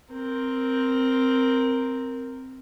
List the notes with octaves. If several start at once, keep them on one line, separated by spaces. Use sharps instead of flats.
C4 A#4